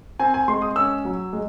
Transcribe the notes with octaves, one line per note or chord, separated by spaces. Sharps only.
C4 G#5
G#5
G#3 C6
D#6
C#4 E6
F#3
G#3